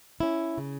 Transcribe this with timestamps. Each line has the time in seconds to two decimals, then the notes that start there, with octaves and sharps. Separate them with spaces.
0.20 C#4 E4
0.58 C#3